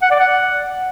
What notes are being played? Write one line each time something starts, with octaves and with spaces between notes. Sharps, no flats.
F#5
D5
F#5